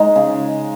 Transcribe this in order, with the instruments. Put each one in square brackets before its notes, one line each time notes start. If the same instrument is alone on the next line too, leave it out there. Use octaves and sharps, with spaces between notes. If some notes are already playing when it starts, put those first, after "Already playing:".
Already playing: [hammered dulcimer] G#3 D#4
C#3